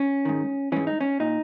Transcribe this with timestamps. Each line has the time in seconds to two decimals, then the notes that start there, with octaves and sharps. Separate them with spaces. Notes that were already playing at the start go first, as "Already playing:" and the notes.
Already playing: C#4
0.25 G#2 D#3
0.72 G#2 E3 C#4
0.87 D#4
1.01 C#4
1.20 A#2 D#4